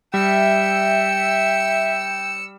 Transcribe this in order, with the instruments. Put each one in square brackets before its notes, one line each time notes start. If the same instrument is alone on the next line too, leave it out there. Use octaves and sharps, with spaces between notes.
[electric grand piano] G3 [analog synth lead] E5 [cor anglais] G5 [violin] E6 C#7